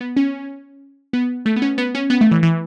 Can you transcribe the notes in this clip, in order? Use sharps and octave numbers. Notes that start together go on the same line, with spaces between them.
B3
C#4
B3
A3
B3
C#4
B3
C#4
B3
A3
E3
E3